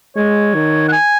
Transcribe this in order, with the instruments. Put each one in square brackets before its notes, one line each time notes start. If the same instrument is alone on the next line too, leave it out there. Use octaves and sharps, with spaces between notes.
[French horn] G#3 [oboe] C#5
[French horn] D#3
[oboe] F#5
G#5